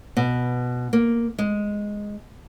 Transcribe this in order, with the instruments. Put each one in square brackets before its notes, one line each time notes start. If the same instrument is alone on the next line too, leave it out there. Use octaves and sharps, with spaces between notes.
[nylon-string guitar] B2
A#3
G#3